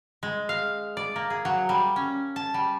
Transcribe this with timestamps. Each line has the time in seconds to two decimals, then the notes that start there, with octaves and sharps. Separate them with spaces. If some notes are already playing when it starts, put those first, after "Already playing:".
0.23 G#3
0.49 F5
0.97 D5
1.16 A#3
1.30 G#4
1.45 F#3
1.69 G3
1.96 C#4
2.36 A5
2.54 G3